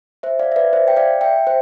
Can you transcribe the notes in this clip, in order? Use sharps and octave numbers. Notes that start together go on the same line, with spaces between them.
C5 E5
D5 F5
E5
B4 D5
C5 E5
G5
D5 F5
E5 G5
C5